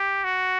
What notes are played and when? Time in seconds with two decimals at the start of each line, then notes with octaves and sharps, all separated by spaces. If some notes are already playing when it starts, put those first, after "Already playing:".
Already playing: G4
0.24 F#4